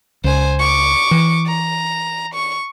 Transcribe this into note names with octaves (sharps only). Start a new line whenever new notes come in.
C#2 C5 G#5
C#6 D6
E3
A#5
C#6